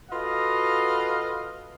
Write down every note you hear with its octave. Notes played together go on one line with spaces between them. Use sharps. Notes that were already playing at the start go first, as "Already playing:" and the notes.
F4 F#4 A4 B4 D#5 F5